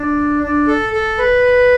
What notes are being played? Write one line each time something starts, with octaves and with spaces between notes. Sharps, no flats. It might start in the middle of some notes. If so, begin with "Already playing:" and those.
Already playing: D4
D4
A4
A4
B4